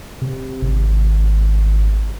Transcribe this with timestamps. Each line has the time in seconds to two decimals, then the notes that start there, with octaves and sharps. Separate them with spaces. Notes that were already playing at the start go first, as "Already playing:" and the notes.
0.22 C3
0.62 G#1